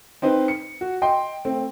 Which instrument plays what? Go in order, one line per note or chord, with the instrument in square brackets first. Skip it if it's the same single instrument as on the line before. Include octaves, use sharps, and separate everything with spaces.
[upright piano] C4 D#4 B4 C5
C#7
F#4
D#5 G5 C6
A3 C4